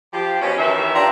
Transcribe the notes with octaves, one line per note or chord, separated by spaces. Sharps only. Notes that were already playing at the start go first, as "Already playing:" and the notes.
F3 G4
B2 C#4
D#3 E3 E5
D4 F4 G4 A#5